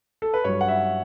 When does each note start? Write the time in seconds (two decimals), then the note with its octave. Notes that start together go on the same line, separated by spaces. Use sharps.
0.22 A4
0.34 B4
0.44 G2 F#3 C#5
0.61 F#5
0.68 E5